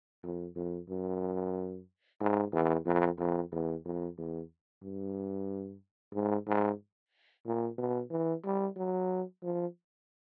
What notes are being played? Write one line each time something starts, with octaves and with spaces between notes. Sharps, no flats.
F2
F2
F#2
G#2
E2
F2
F2
E2
F2
E2
G2
G#2
G#2
A#2
B2
E3
G3
F#3
F3